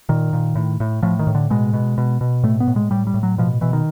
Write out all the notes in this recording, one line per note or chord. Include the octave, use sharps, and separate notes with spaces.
A#2 D#3
A#2
A2
A2
A2 F3
D#3
A2
D3
B2 G#3
B2
B2
B2
A2 A3
B3
A2
G#3
A2 G3
G3
A2
F#3
B2 F3
B2 E3
D#3